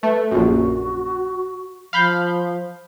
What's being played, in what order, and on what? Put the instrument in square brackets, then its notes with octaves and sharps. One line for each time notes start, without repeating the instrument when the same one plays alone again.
[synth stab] A3 [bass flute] B4
[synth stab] A#1 F#2 [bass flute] F#4
[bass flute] F3 [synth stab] F5 B5 G6